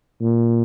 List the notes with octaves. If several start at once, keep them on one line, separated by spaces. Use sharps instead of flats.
A#2